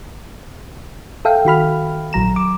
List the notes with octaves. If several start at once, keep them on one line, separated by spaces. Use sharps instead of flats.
A4 E5 F5 G5
D#3 F#4 B5 F6
A#1 F#3 A#5 E7
D6